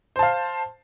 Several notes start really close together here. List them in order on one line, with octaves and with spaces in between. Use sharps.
C5 A5 F5